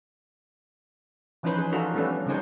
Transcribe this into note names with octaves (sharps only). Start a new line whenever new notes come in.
E3 F3 C#4 D#4 B4 C5
G#4
D4 D#4 F4 F#4 A4 A#4
G3 A3 B3 C#4 D4 A4
C#3 G3 C4 D#4 C5 C#5